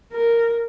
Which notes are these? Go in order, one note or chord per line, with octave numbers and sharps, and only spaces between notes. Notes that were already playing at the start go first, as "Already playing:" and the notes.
A#4